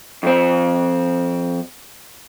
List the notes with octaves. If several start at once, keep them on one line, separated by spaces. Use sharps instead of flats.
F2 C4